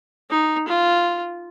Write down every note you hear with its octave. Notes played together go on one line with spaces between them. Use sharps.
D#4
F4